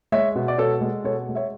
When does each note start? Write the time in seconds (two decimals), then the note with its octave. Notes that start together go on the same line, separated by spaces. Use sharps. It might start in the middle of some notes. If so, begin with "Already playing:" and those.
0.12 G#3 C#5 E5
0.35 B2
0.48 D5
0.58 B2 A4 C#5
0.81 G#3
1.04 B2 A4 C#5
1.29 G#3
1.35 C#5 E5